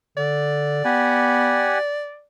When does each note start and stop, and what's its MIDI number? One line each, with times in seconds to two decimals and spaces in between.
0.17 0.81 50
0.17 2.24 74
0.85 1.77 59
0.85 1.78 67
0.85 1.78 78
0.85 1.78 80